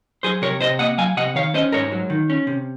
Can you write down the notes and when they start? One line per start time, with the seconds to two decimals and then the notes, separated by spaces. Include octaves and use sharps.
0.23 F#3 G#4 C5
0.42 C3 A#4 C#5
0.61 C3 C5 D#5
0.79 A#3 D#5 F#5
0.98 F#3 F5 G#5
1.17 C3 D#5 F#5
1.35 D#3 C#5 F5
1.54 C#4 C5 D#5
1.72 G#2 A#4 C#5
1.92 F#3
2.10 D#3
2.30 C#4
2.47 C3